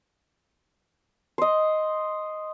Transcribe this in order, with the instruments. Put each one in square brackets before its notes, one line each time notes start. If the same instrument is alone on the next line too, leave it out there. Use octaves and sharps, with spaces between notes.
[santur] C5 D#5